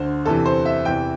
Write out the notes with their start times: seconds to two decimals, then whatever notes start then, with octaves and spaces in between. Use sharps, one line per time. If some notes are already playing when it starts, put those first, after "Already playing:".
Already playing: D2 D3 C5
0.25 E2 C3 E3 A4
0.46 C5
0.65 E5
0.85 E2 C3 E3 G5